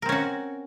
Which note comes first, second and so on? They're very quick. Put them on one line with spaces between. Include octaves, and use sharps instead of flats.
A#4 C4 C#4 F#4